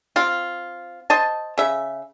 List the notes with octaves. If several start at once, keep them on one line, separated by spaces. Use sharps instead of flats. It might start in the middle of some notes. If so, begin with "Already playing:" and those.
C4 F4
C5 D#5 A5
C#3 E5